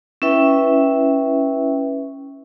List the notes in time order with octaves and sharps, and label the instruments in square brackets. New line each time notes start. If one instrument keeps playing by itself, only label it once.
[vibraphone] C#4 E4 B4 E5 G5